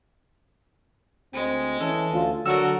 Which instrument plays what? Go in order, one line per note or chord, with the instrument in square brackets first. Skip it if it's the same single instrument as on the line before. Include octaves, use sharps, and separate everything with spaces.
[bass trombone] D2 [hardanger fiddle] G#3 [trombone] C4
[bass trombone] E3 [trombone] C#4 [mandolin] A4
[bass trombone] D2 [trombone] F4
[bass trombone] D3 [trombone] F#3 [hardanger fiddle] F#4 A#4 [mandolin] A4 E6